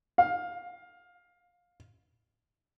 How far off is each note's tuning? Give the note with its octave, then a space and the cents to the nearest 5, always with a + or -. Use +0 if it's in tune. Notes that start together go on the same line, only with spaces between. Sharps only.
F5 +15